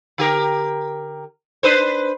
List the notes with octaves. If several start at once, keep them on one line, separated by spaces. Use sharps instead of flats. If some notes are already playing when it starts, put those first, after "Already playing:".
D3 G4 A#4
D4 B4 C5